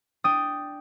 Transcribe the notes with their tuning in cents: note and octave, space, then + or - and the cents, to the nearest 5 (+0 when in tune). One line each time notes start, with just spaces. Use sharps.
D4 +0 G5 +0 D#6 +0